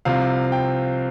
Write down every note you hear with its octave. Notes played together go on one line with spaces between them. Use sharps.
C2 C3 F3 C4 F5
G5